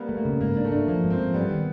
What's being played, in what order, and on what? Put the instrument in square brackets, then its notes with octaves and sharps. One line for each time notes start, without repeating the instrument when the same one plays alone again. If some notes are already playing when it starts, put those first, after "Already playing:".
Already playing: [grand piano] G3 A#3 B3
[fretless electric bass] A3
[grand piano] A#3
[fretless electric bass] C#3
[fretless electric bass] G#2 [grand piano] A#3
[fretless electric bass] D4
[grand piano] A3
[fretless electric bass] D4
[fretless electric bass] F3 [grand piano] A#3
[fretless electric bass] G#2
[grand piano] C4
[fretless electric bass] F3
[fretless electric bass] G3 [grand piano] B3
[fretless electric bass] D#3